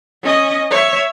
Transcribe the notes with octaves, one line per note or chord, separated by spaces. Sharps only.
C#4 D#5
C#5 E5